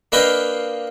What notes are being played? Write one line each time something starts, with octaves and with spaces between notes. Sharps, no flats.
A#3 D4 B4 D#5 F5 G5